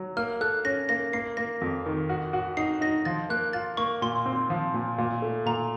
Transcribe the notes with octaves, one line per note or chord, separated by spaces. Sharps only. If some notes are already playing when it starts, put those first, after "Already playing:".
Already playing: F#3
A#3 F6
A4 F#6
C#4 A#6
A#3 A#6
A#3 C7
A#3 A#6
F2
D#3
F#4
F#4
D#4 C7
D#4 A#6
F3 A6
A#3 F#6
F4 A6
A#3 C#6
A#2 C6
C4
F3
A#2
A#2
A3
A#2 A#5